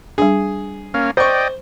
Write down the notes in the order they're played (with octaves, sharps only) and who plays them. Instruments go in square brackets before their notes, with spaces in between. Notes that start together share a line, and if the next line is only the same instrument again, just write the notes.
[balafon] G3 D4 [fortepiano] G#4
[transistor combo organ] A#3 C#4 F5
[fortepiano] C5 C#6 [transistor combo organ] D5 D#5 G5